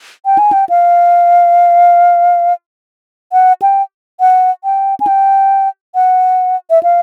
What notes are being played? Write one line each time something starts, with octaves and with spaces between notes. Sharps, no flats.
G5
G#5
G5
F5
F#5
G5
F#5
G5
G#5
G5
F#5
E5
F5